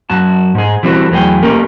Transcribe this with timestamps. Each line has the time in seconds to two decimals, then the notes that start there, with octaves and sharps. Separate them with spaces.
0.10 F#2 F#4 A5
0.55 G#2 G#4
0.83 E3 G3 C4 E4 F#4 A4
1.11 E2 F#3 A3 G#4 G5
1.42 A#3 C#4 G4 A4 A#4